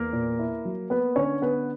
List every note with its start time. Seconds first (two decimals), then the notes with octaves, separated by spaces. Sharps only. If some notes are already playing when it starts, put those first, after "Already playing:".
Already playing: E2 A#3 A#4
0.13 A#2
0.39 E4
0.65 F#3
0.90 A#3 B3 B4
1.16 D3 C#4 C#5
1.42 D3 B3 B4